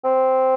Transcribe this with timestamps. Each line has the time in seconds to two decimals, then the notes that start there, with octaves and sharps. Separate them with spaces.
0.04 C4